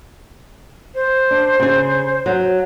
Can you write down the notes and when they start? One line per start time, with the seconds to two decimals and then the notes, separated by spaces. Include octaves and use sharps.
0.95 C5
1.31 D4
1.60 C#3 G#4
2.26 F#3